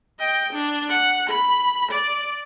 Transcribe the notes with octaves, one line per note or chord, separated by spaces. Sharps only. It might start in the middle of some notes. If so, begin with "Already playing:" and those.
D#5 G5
D4
F#5
B5
D5